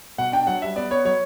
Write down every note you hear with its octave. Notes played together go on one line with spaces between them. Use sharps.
B2 F#5
D4 G5
F#3 F#5
G3 E5
B3 D5
B3 C#5
F#3 C#5